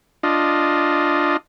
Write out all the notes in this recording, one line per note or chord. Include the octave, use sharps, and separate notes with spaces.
D4 F4 D#5